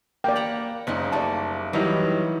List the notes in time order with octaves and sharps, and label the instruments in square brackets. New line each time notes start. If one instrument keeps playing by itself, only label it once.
[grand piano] A#3 [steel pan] D5 G5
[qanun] F#5 A#5 B5
[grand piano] F#1 [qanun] C#3 G#3 D#4
[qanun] G3 A3 A#3 [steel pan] D5 A5
[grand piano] D#3 F#3 G3 [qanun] E3